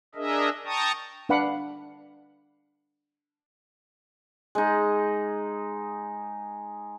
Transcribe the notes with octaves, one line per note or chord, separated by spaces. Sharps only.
D4 G#4 A#4 D#5 E5
G5 A5 A#5 C#6 D#6
D4 B4 F5 F#5 B5 D6
G#3 D#4